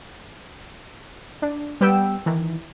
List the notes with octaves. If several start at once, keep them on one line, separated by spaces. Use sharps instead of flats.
D4
G3 B3 G5 E6
D#3 E3